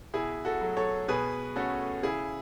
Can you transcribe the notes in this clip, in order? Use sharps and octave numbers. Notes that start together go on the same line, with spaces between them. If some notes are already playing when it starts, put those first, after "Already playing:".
B2 E4 G#4
F#4 A4
F#3 A3
A4 C#5
B2 G#4 B4
A3 C#4 F#4 A4
C#3 E4 G#4